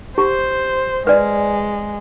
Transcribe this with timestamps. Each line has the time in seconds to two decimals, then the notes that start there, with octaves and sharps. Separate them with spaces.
0.18 G4 C5
1.07 G#3 B4 D5